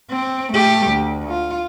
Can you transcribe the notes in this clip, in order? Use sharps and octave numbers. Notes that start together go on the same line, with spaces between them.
C4
A3 G4
D2
F4